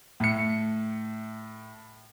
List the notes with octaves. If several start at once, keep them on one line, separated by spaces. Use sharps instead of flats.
A2 C#7